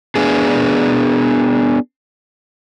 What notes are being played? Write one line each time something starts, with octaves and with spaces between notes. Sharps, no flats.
B3 D4 G#4